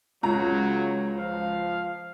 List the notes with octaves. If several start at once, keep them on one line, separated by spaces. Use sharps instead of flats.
C#2 C#3 F#3 F4 A#5
F3 F5